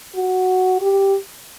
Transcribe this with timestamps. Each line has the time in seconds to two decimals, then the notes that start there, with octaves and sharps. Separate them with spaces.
0.16 F#4
0.81 G4